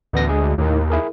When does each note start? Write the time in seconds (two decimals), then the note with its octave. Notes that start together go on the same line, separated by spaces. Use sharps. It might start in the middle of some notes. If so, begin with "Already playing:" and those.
0.13 A1 D2 B3 A#6
0.29 G#3 G#4
0.58 D#2 A2 D#3
0.90 E4 G#4 A#4